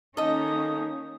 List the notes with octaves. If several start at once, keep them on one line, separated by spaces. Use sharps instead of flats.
D#3 A#3 C#4 D#4 A4 D#5 D#6